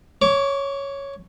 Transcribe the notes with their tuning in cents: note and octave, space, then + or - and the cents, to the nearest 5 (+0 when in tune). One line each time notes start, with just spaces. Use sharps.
C#5 +0 D6 -30